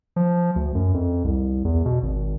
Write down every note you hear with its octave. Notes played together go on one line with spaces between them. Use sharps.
F3
D2
F#2
F2
C2
E2
B2
G#1